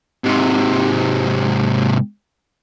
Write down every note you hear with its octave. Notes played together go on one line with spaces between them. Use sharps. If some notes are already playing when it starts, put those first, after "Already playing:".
G#2 C3